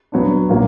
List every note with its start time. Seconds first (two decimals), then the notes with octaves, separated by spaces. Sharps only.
0.12 F#3 B3 D4
0.49 A#2 F#3 A#3